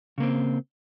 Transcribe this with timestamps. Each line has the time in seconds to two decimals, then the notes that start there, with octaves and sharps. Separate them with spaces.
0.18 C#3
0.20 A#3
0.23 C4